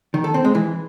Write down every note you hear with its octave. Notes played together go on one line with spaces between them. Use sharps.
D#3
A4
C4
G#3
E3